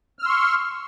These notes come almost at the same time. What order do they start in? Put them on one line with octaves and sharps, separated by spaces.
F6 E6 C6 C#6